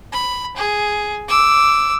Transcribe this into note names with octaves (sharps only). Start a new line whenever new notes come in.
B5
G#4
D6 E6